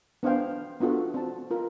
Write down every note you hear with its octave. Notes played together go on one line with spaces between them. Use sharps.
B3 D4 C5 F5 G5
B3 D4 F4 F#4 A4
C4 A5
F4 A#4